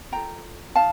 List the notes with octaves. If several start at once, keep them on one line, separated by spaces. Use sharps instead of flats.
F4 A4 G5 A#5
D#4 F5 A5